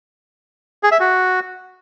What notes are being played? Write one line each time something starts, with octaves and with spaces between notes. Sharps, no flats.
G#4
E5
F#4